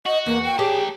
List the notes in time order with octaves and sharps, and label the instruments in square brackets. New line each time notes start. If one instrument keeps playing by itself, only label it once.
[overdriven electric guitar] F#4 [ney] D#5
[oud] E2 [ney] A#3
[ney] G5
[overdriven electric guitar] A#3 A5 [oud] G4 G#4 C#5